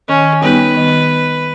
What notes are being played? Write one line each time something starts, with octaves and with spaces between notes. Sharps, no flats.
D#3 C#4
G3 B3 D#4 G4 B4
D#3